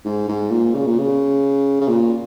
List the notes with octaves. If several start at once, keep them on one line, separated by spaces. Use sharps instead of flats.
G#2
G#2
A#2
C#3
A#2
C#3
C#3
A#2